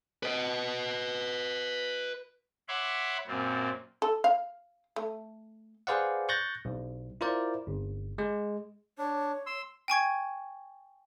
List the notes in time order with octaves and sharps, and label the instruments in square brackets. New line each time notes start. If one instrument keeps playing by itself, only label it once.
[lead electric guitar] B4 D#5
[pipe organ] C#5 E5 F#5 B5 C6 D6
F#2 A#2 C4
[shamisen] A4
F5
A3
[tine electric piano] G#4 B4 C5 D5 F5 F#5
C#6 F#6 G6 A6 A#6
B1
E4 F4 A#4 C5 D5
G1
G#3
[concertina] D4 [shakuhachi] C#5
[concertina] C6 E6
[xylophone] G5 G#5 C#6 G#6